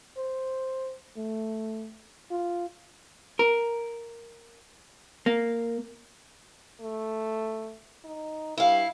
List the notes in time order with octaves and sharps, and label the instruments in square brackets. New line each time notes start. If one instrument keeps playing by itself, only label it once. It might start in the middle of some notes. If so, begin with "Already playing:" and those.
[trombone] C5
A3
F4
[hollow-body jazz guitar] A#4
A#3
[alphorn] A3
D#4
[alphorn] G2 [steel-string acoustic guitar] E4 F5